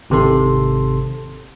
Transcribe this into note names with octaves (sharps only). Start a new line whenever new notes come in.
G#1 C3 D#3 A4 C6